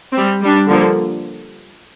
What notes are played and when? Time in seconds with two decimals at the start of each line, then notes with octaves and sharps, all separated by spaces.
0.13 G3 C4
0.41 G3 D4
0.69 D3 F3 A#3